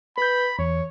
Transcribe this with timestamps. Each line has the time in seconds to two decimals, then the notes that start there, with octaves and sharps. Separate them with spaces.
0.18 B4 B5 G6
0.59 E2 C#5